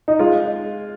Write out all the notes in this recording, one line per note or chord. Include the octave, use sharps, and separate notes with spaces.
D#4
G#3 F4